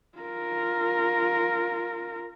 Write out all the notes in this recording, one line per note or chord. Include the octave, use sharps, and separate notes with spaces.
F4 A#4